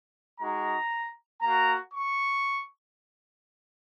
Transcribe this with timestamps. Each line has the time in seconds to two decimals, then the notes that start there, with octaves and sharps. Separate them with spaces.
0.40 G#3 D#4 F#4 A#5
1.41 A#3 F#4 A#5
1.91 C#6